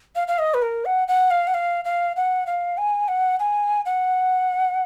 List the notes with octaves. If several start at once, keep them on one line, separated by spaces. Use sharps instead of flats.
F5
F5
D#5
B4
A#4
F#5
F#5
F5
F#5
F5
F5
F#5
F5
G#5
F#5
G#5
F#5